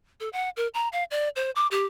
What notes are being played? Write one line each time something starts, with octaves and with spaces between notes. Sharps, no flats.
A4
F#5
A#4
A#5
F5
D5
C5
D6
G4